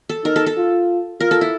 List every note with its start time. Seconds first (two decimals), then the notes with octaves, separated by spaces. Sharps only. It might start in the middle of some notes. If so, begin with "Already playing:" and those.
0.09 A4
0.25 D#4 A#4
0.36 A4
0.46 A4
0.57 F4
1.20 F4 A#4
1.31 A4
1.41 E4